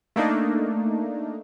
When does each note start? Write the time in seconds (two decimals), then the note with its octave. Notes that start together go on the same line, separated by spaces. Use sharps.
0.16 A3 A#3 D4 D#4